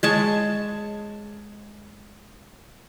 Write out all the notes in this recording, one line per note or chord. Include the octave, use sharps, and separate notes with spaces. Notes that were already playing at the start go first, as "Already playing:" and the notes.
G#3 C#5 A5